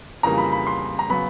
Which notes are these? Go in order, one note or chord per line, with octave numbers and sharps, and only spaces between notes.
F2 C#3 E3 G3 A#3 A#5
B5
B5
C6
A#5
C#3 F#3 B3 B5